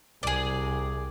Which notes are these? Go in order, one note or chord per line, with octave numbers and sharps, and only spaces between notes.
C2 G#4 D5